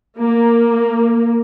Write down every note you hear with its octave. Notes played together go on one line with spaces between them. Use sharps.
A#3